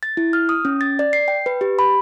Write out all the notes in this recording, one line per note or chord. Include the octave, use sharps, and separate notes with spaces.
A6
E4
F6
D#6
C#4
A6
D5
C7
G5
B4
G4
B5